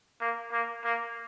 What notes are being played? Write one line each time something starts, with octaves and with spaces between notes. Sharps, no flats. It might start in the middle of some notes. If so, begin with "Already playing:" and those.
A#3
A#3
A#3